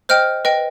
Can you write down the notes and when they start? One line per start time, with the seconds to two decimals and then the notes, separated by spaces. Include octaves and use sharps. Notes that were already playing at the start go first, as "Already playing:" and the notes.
0.09 C5 D#5 G5 F6
0.45 B4 D#5 G5